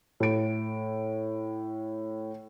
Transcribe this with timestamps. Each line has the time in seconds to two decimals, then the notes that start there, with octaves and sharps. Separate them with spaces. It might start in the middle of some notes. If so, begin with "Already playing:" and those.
0.20 A2 D7